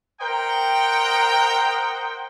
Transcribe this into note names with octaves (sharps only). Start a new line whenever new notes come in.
A#4 C5 D#5 F#5 G5